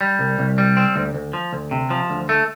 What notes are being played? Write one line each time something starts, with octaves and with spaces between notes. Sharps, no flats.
G3
C2
C2
G3
C4
D2
D2
F3
D2
C3
F3
D2
A3